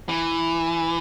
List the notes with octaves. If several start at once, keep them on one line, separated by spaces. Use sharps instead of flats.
E3